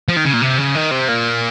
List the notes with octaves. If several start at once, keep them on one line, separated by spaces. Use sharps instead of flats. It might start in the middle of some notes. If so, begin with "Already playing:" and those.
F3
D#3
C#3
A#2
C3
C#3
D#3
C3
A#2